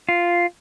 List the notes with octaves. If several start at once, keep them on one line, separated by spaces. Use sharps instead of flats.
F4